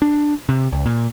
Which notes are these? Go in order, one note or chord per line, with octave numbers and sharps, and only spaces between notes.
D4
C3
C#2
A#2